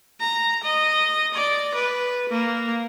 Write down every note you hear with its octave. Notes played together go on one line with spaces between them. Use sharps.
A#5
D#5
D5
B4
A#3